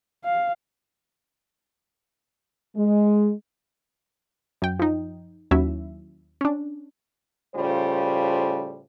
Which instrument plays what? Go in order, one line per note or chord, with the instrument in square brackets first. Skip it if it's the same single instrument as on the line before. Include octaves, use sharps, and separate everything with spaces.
[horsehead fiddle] F5
[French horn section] G#3
[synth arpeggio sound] F#2 G5
F3 D#4
D#2 F#3 C#4 E4 E5
C#4 D4
[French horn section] A2 C#3 G3 F4 A4 C5